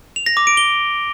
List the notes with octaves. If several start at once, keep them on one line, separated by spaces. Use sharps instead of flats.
F7
A#6
D6
D7
G7